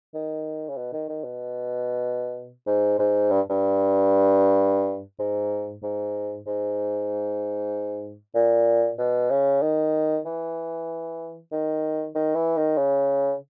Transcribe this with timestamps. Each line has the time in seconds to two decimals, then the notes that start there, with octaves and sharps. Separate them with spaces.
0.14 D#3
0.69 C#3
0.77 B2
0.93 D#3
1.09 D#3
1.24 B2
2.67 G#2
2.99 G#2
3.30 G2
3.50 G2
5.19 G#2
5.83 G#2
6.46 G#2
8.35 A#2
8.99 B2
9.30 C#3
9.62 D#3
10.26 E3
11.52 D#3
12.15 D#3
12.35 E3
12.57 D#3
12.77 C#3